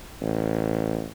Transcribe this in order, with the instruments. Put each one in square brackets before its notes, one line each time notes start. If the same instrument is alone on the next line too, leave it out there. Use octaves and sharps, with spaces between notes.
[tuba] A1